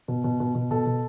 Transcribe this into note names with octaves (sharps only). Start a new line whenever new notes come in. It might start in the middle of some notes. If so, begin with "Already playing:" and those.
B2
B2
B2
B2
B2 A4
B2